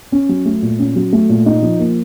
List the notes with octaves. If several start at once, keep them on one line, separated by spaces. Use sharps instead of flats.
C#4
F#3
A3
A#2
C#4
F#3
A3
A#2
D#4
F3
A#3